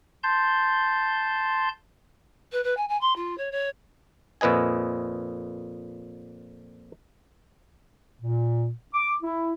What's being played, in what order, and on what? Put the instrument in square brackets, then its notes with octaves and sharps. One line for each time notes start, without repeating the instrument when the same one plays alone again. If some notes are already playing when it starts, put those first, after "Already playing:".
[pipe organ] A5 C6 G6
[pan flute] B4
B4
G#5
G#5
C6
F4
C#5
C#5
[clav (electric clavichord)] F2 A#2 B4 D#5 G#5
[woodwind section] A#2
D6
E4